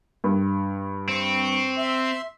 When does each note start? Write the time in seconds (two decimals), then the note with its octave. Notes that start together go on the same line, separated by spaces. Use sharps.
0.24 G2
1.09 C4 C#6
1.77 E5 C6